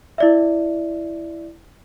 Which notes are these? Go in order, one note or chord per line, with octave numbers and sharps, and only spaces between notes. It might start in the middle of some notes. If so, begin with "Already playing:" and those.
E4 D5 E5